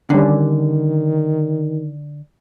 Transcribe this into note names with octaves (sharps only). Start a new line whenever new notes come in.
D3 D#3 G3 C#4 D4